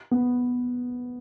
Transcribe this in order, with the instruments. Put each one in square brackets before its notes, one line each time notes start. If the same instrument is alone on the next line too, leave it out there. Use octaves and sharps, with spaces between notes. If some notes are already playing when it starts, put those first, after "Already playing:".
[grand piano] B3